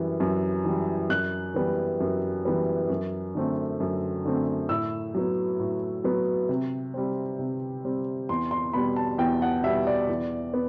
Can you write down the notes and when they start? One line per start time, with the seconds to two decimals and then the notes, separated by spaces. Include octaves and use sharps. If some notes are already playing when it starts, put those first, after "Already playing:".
Already playing: F#2 E3 G3
0.20 F#2
0.65 E3 G3
1.10 F#2 F#6
1.54 E3 G3 B3
2.00 F#2
2.45 E3 G3 B3
2.90 F#2
3.35 D3 A3 C4
3.80 F#2
4.25 D3 A3 C4
4.69 A2 E6
5.15 F#3 B3
5.60 A2
6.04 F#3 B3
6.49 C3
6.94 G3 C4
7.39 C3
7.85 G3 C4
8.29 E2 C6
8.51 C6
8.73 B2 G3 B5
8.96 A5
9.18 E2 G5
9.42 F#5
9.63 B2 G3 E5
9.87 D5
10.08 E2
10.54 B3